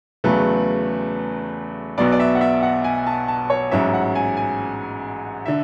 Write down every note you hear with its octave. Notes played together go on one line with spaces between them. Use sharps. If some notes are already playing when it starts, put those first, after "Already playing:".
E2 C#3 F#3 A3 B4
B1 B2 F#3 B3 D5
D5
E5
F#5
E5
F#5
G#5
A5
A5
C#5
A1 G#2 F#3 C#4 E5
F#5
G#5
G#5
D3 E5